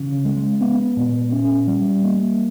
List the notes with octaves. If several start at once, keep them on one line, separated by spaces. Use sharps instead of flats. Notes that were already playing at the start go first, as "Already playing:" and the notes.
Already playing: C#3
G#3
B3
A#2
C#4
G3
A#3